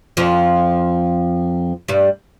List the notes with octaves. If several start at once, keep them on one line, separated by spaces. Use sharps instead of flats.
F2 F3
G2 G3